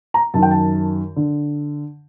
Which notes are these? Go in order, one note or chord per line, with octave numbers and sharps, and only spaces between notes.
A#5
F#2 D#3 A5
G5
A5
D3